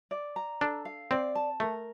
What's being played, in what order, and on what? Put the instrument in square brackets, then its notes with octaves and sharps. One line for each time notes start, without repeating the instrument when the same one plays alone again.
[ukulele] D5
A#5
[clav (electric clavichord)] D4 [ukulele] A4
[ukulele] F5
[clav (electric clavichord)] C4 [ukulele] D5
[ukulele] A5
[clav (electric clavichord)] A3 [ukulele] A#4